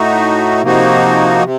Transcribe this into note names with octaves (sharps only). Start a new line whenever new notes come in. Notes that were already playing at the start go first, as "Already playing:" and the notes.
Already playing: A2 A3 D#4 F#4
C3 F3 A#3 D#4 F#4
C3